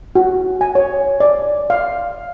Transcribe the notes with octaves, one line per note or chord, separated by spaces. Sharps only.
F#4
G#5
C#5
D5
F5